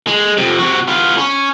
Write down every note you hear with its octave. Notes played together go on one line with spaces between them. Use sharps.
G#3
F2 C3
C3 F#4
B3 F4
C#4